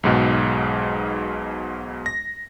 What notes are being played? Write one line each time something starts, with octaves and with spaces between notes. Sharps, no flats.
B1 G#2 B2 G#3
A#6